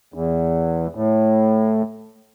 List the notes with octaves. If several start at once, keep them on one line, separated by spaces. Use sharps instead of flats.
E2
A2